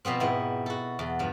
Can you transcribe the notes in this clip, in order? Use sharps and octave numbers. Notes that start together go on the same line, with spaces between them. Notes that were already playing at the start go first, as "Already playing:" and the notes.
B2 F3 B3 C4
G#2 B3 E4
F#4 A4
E2
G2 F3